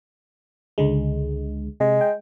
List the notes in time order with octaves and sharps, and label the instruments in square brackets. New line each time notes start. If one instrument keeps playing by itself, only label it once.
[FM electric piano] C#2 D3 G#3
[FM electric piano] C3 [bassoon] G#3
[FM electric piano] G5